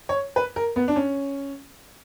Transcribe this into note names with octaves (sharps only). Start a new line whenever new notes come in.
C#5
B4
A#4
B3
D4
C#4